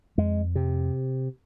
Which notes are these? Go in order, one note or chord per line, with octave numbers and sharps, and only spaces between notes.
F2 G#3
C3